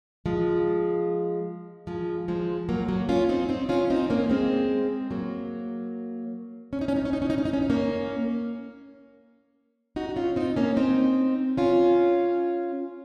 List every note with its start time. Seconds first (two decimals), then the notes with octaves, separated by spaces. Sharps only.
0.26 F3 G#3
1.87 F3 G#3
2.28 F3 G#3
2.69 F#3 A#3
2.88 F#3 A#3
3.09 C#4 F4
3.29 C4 D#4
3.49 C4 D#4
3.69 C#4 F4
3.90 C4 D#4
4.10 A#3 C#4
4.30 G#3 C4
5.11 F#3 A#3
6.73 C#4
6.81 D#4
6.88 C#4
6.96 D#4
7.05 C#4
7.13 D#4
7.22 C#4
7.30 D#4
7.38 C#4
7.45 D#4
7.53 C#4
7.62 D#4
7.70 A#3 C#4
9.96 D#4 F#4
10.09 F#4
10.16 C#4 F4
10.36 C4 D#4
10.56 A#3 C#4
10.76 C4 D#4
11.57 C#4 F4